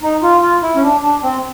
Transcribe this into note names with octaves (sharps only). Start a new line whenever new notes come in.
D#4
F4
F4
E4
C#4
D4
D4
C4